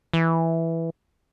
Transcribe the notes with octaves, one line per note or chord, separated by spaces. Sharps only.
E3